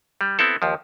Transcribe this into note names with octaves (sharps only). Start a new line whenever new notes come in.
G3
B3 C4 E4 A4
D#2 F3